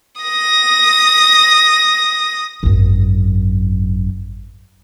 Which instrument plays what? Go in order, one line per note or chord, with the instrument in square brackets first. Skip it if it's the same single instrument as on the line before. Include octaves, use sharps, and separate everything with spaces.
[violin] D#6 A#6
[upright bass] G#1 F#2